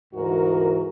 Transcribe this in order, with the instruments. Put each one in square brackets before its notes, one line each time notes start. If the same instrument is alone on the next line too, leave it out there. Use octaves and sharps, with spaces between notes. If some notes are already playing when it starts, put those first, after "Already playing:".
[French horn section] D2 G#2 E3 F#4 A#4